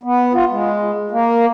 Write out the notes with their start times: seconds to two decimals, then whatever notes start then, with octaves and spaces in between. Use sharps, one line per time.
0.03 B3
0.33 F4
0.51 G#3
1.11 A#3